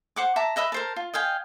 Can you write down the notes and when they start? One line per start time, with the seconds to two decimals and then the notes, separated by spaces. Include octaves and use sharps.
0.16 C5 F#5 D6
0.36 E5 A5 A#5 D6
0.56 B4 D#5 E5 B5
0.72 A#4 C5 A5
0.96 F4
1.14 D#5 F5 G5 G#5